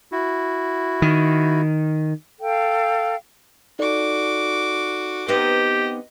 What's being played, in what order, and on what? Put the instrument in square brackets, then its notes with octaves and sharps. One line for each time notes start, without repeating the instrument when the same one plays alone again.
[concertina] E4 F#4
[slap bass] D#3
[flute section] A4 F5 G5
[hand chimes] D#4 A4 D5 [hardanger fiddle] F#4 D6
[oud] B3 C4 D#4 [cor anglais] G4 [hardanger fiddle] D#5